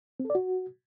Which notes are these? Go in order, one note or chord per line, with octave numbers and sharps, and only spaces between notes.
C4
A4
D5
F#4